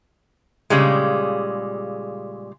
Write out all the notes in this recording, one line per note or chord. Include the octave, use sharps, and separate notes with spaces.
A#2 C#3 G3 G#3